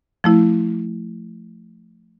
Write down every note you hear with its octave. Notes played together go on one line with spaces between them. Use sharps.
F3 A3 E4